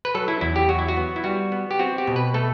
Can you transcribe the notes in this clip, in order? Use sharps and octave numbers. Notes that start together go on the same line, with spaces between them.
B4
F#3 A4
E4
E2 E4
G4
F#3 F#4
E4
F#4
B3
E4
G3 F#4
B3
G4
C4 F#4
G4
B2
B4
A3 A4